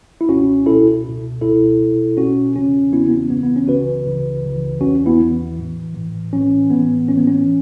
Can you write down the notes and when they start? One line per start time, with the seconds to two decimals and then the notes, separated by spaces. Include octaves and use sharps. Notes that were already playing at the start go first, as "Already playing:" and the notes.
0.21 E4
0.29 C#2 B2 C#4 F#4
0.66 C#2 B2 E4 A4
1.04 C#2 B2
1.41 C#2 B2 E4 A4
1.80 B1 B2
2.17 B1 B2 C#4 F#4
2.55 E2 C#3 E3 C#4 F#4
2.92 E2 C#3 E3 B3 E4
3.08 B3
3.11 C#4
3.30 C#2 C#3 E3 B3
3.43 B3
3.56 C#4
3.68 C#2 C#3 E3 F#4 B4
4.06 C#2 C#3 E3
4.43 C#2 C#3 E3
4.81 E2 E3 C#4 F#4
5.06 B3 E4
5.19 E2 E3
5.57 A1 A2 E3
5.95 A1 A2 E3
6.33 B1 A2 E3 C#4
6.69 B1 A2 E3 B3
7.07 A1 A2 E3 C#4
7.17 B3
7.27 C#4